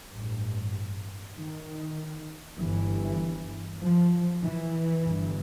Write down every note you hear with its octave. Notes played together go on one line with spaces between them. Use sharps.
A1 G2
D#3
G1 G2 E3
F3
E3
G1 G2